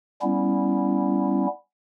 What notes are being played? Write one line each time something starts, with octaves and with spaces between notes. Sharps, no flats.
G3 B3 C#4 E4